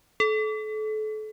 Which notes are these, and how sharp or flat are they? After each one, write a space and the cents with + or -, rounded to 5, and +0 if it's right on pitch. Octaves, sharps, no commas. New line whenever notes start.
A4 -30